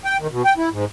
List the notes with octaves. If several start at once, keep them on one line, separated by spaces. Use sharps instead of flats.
G5
D#3
B2
G5
E4
G#2